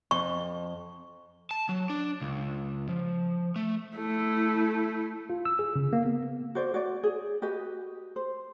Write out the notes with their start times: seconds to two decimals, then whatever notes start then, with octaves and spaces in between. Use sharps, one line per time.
0.11 F2 C#6
1.51 A5
1.69 F#3
1.90 D4
2.21 C#2
2.89 F3
3.56 A3
3.96 A3 E4
5.30 F4
5.45 E6
5.59 G#4
5.76 C#3
5.93 A#3
6.06 B3
6.55 F#4 C5 D5
6.74 F#4 C#5 D5
7.03 G#4
7.42 F#4 G4 B4 D#5
8.16 C5